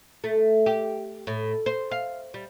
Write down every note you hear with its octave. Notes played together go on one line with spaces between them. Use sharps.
A3
G4
A2
C5
F5
G3